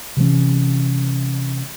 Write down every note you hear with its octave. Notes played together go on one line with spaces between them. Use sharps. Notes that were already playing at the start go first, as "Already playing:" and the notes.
C3 E3 G#3 C#4